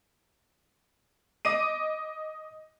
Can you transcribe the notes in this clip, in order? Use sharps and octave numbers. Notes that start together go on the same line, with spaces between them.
D#5 D6 D#7